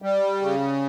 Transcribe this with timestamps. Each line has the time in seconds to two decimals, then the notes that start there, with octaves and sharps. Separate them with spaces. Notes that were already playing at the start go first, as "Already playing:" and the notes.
0.02 G3
0.41 C#3